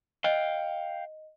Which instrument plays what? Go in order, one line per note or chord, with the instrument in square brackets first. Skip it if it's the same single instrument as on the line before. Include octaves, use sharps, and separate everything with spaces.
[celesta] D#5 [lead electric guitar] F5 G5